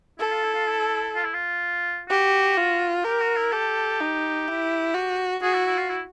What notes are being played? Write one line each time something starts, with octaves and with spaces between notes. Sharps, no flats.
E4 A4
F4
E4
F4
E4
F4
E4
F4
F#4 G4
F4
G4 A#4
F#4
E4
G4 A4
D#4
E4
F#4
F#4 G#4
E4
E4
F4
E4